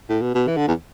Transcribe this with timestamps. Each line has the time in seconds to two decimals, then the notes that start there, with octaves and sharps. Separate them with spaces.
0.09 A2
0.22 B2
0.35 B2
0.47 E3
0.57 D3
0.68 E2